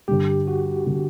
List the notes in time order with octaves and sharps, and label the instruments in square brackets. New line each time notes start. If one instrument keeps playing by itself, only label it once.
[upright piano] G2 D3 G3 [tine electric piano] G4
[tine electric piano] F#4
[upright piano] D3 G3